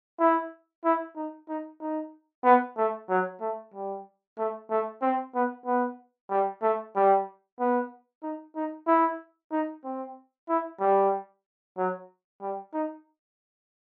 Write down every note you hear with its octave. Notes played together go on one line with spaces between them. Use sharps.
E4
E4
D#4
D#4
D#4
B3
A3
F#3
A3
G3
A3
A3
C4
B3
B3
G3
A3
G3
B3
D#4
D#4
E4
D#4
C4
E4
G3
F#3
G3
D#4